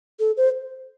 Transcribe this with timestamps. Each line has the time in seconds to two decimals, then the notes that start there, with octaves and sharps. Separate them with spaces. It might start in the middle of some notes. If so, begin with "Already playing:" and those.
0.20 A4
0.37 C5